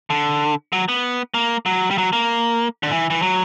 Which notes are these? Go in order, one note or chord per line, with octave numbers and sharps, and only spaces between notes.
D3
F#3
B3
A#3
F#3
G3
F#3
A#3
D3
E3
E3
F#3